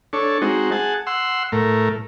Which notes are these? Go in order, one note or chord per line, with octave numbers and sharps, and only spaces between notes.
D4 A4 C#5
G#3 C4 D#4 F#4
G#4 F#5 A5
F#5 C6 E6
A2 A3 A#4